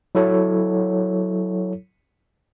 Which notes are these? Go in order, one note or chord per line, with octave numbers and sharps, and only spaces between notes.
F#3 E4 A4 C#5